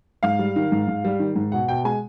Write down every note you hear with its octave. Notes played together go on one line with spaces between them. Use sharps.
G#2 F5
G3
D#3
G#2
G#2
G3
D#3
G#2
B2 F#5
B2 G5
G#3 G#5